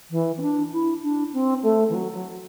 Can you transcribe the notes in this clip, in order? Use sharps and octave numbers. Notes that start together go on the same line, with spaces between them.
E3
C4
D4
E4
D4
C4
A3
E3
F#3
F#3